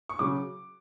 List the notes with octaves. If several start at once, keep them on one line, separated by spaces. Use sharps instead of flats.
C#6
C#3 F#3 D6